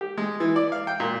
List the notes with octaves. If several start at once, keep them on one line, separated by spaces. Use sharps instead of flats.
G4
G#3
E3
D5
F5
G5
A#2